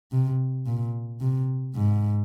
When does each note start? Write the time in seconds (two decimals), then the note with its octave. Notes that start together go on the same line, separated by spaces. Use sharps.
0.12 C3
0.66 A#2
1.21 C3
1.75 G#2